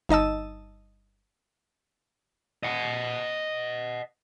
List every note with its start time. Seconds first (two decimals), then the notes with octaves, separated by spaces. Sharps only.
0.09 G1 D#4 D#5 A5 E6
2.63 D#5 F#5